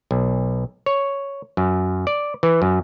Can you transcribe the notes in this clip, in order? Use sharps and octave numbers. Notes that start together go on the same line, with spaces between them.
B1
C#5
F#2
D5
E3
F#2